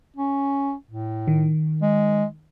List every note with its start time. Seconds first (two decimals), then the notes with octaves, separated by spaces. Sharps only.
0.16 C#4
0.91 A2
1.28 D#3
1.82 G#3